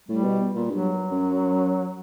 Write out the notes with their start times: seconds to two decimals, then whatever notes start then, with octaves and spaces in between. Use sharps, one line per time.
0.09 A2 G3
0.24 B2
0.55 A#2
0.70 G2 F#3
1.11 F#2